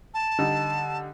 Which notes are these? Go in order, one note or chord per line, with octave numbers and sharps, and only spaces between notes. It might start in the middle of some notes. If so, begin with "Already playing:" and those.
A5
D3 G3 D#4